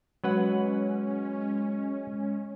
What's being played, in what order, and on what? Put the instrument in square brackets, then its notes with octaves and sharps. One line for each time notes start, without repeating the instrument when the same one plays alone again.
[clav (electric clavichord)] F#3 B4 F#5 [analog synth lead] G#3 [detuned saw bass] C#4